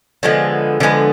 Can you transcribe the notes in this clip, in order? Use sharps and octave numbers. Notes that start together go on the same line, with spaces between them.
D3 F3 G#3 B3
D3 F3 G#3 B3